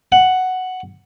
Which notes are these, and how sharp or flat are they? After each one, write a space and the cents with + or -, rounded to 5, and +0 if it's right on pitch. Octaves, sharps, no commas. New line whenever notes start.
F#5 +5